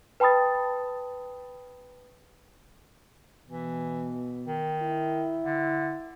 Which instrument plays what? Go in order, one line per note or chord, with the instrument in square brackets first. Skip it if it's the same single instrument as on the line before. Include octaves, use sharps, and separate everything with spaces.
[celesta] B4 G5 A5 B5 D#6 A6
[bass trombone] B2 [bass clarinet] E3
[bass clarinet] D#3
[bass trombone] E4
[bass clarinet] D3